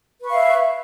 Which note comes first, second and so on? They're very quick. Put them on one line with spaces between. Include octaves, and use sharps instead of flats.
B4 C#6 F5 E5